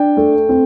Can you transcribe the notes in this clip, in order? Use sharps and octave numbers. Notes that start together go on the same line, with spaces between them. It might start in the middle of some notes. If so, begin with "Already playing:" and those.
Already playing: D4 G5
A3
C4